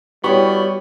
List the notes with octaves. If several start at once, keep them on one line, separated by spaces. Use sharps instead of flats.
G3 B3 E4 F#4 G4 C#5 C#6